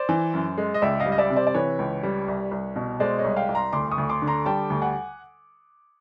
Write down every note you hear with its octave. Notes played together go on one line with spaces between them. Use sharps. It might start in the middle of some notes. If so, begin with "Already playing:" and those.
Already playing: C5 D5
E3
F#2
G#3
D#5
C#2 D5 E5
D#5 F5
G3
D#5
D5 E5
C3
C5 D5
D5
E3 B4 C#5
C#2
G3
C2
C2
B2
G#3 C5 D5
C#5 D#5
C2
F5 G5
C2
A#5 C6
D2 C6 D6
C#6 D#6
D2
C6 D6
D3
A#5 C6
G3 G5 A5
D2
F#5 G#5